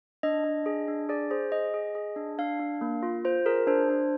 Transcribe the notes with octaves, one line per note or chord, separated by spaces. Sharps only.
D4 D#5
D4
G#4
D4
G#4 D5
G#4 C5
G#4 D#5
G#4
G#4
D4
D4 F5
D4
A#3
F4
F4 C5
G#4 A#4
D4 C5
D4